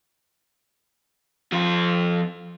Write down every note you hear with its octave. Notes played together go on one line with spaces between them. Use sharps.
F2 F4